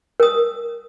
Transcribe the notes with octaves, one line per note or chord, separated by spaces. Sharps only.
A#4 D#6